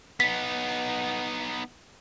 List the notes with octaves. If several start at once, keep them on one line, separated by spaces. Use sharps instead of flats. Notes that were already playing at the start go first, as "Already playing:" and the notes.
B3 D#4 B6